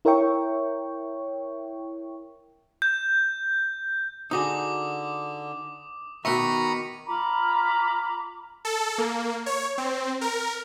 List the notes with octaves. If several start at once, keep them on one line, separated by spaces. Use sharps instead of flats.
E4 A#4 C#5 E5 G5 C#6
G6
D3 D#4 F#4 G#4 D6 D#6
B2 D#3 E5 A#5 B5 C#6 B6 C#7
F4 A#5 B5 D6
A4
A#3
C#5
C4
A#4